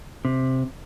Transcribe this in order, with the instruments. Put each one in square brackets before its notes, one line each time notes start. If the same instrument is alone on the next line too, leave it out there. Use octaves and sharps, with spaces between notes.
[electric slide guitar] C3